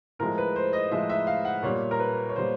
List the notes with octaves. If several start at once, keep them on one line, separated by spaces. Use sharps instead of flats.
A2 F3 G#3 A#4
B4
C5
D#5
A2 F3 G#3 E5
E5
F5
F#5
A#2 G3 C#5
A#4
B4
C#5
A#2 G3 C5